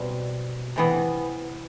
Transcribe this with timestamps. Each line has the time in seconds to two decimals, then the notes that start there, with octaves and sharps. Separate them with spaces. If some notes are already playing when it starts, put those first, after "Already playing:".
Already playing: B2 G3 C4
0.76 C3 E3 B3